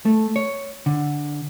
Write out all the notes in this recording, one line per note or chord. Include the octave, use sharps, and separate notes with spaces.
A3
C#5
D3